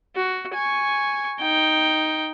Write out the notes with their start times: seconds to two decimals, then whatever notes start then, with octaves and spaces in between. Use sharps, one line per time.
0.16 F#4
0.55 G#5 C#6
1.41 D#4 G5